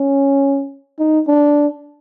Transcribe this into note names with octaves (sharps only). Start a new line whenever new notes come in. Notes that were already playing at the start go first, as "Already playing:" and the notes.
Already playing: C#4
D#4
D4